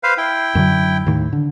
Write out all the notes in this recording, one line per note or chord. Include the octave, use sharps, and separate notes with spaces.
B4 C5 F5
E4 G5
F#2 D3 F#3
D#2 A2 D#3
D3